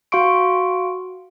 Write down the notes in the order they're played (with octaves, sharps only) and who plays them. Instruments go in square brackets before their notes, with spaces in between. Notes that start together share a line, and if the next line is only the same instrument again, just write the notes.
[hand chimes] F#4 F5 C6 C#6 D7